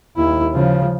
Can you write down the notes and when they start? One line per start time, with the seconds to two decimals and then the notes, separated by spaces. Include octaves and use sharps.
0.17 D#2 E4
0.54 C#3 F3